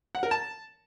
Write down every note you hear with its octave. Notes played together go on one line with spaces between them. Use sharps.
F#5
A#4
A5